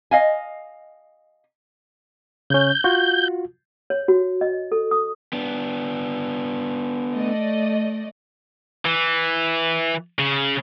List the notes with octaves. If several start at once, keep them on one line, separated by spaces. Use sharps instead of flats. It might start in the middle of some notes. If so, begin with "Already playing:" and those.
D#5 F5 G#5
C#3 C#4 G6
F4 F#4
C#5
F#4
D#5
A4
D#6
B3 D4
A3 D5 D#5
E3
C#3